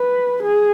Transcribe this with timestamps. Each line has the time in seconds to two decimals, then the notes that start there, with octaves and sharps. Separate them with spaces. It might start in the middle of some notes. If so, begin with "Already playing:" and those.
Already playing: B4
0.43 G#4